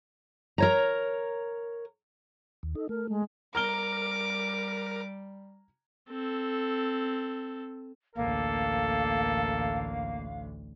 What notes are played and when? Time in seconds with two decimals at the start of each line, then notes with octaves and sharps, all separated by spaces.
0.58 A#4 C#5 A#5
2.63 D#2
2.75 D#4 A4
2.89 A3 A#4
3.09 G#3
3.55 G3 A#4 A#5 D6 F6 G7
6.10 C4 A4
8.16 A1 D2 A#3 A4 F5